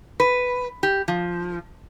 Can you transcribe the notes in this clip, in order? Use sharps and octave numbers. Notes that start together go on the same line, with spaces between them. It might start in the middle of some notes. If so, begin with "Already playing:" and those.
B4
G4
F3